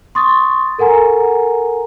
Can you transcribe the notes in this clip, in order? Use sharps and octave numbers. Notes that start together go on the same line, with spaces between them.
C6 C#6 D#6 A6
A4 A#4 F#5 G#5 A#5